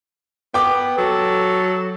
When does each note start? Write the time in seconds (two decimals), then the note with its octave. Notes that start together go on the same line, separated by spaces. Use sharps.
0.54 B3 G5 D6
0.98 F#3 A4